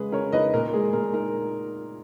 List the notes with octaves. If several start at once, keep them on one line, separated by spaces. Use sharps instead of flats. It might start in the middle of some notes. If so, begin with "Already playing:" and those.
Already playing: C#3 G#3 C#4 G#4 B4
C#3 A#4 C#5
D#4 B4 D#5
A#2 A#4
G#3 G#4
A#2 A#4
D#4 A#4